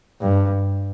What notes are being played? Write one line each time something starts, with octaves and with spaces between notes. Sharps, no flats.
G2